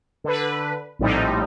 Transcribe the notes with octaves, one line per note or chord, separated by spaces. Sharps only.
D3 B4
A#1 A2 F3 G3 C4 D#4